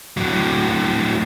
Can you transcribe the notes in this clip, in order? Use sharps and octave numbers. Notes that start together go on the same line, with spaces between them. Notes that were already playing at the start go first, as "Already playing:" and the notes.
A2 F#3